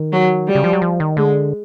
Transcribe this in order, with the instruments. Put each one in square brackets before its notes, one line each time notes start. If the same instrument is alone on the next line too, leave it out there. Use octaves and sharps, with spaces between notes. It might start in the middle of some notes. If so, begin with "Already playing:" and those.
Already playing: [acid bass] D#3
[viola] F#3
G3
[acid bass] C#3
F3
F#3
F3
D#3
[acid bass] D3 [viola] G#3